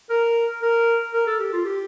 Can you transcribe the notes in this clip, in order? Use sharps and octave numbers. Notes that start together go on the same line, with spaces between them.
A#4
A#4
A#4
A4
G4
F4
G4